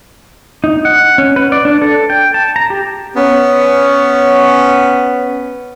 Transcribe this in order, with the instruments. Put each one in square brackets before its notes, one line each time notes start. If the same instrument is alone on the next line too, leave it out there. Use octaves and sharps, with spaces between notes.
[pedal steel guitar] D#4
F#5
C#4
B4
D5
D4
A4
G5
A5
A#5
G4
[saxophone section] B3 C#4